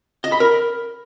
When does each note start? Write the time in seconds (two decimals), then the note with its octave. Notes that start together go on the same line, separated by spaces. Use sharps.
0.24 D#5
0.32 B5
0.40 A#4